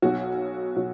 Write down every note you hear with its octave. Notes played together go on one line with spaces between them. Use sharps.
B1 B2 F#3 F#4
B2 F#3